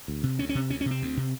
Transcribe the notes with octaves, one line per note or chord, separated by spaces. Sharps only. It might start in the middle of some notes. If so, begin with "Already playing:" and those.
D2
C3
D2 C#4
C#4
C3
D2 C#4
C#4
C3 C4
D2
C3